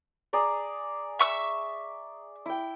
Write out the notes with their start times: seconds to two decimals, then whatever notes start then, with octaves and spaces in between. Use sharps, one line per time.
0.33 G#4 D5 A#5
1.19 E5 C#6 E6
2.46 E4 G5